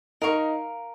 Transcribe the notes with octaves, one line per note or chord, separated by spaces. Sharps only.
D#4 A#4 F5 C#6